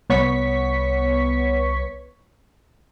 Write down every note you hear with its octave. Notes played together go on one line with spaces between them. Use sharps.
C2 B3 C#5 C#6 B6